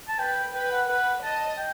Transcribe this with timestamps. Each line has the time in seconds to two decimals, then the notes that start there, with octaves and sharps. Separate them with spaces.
0.08 A5
0.18 B4 G5
0.54 B4 G5
0.71 F#5
0.88 B4 F#5
1.23 D#5 A5
1.57 G5